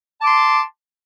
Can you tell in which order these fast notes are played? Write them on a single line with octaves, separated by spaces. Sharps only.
A5 D6 C6